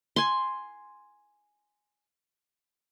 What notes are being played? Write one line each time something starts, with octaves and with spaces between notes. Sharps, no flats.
G#5 C6